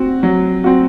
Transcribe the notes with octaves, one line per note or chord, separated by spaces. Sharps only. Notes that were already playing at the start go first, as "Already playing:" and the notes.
Already playing: C4 F#4
F#3
C4 F#4